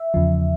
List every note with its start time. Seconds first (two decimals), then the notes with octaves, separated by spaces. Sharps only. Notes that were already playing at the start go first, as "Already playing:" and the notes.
Already playing: E5
0.14 E2 C#3 F3